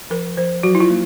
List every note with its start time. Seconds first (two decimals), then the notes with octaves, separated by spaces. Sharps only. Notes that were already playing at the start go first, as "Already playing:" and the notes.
0.10 F3 A#4
0.37 F3 C5
0.63 F#3 F#4
0.75 E4
0.80 F4
0.90 A#3